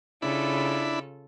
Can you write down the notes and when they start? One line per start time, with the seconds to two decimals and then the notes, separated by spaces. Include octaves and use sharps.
0.22 C#3 D4 E4 F4 A4 B5